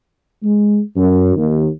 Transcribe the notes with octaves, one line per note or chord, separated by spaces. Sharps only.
G#3
F#2
D#2